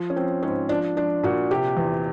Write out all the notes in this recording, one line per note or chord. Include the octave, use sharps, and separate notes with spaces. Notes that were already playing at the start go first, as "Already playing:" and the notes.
Already playing: F3
C#4
F3 C4
G#2 C#4
F3 D4
F3 D4
A#2 F#4
C3 G4
E2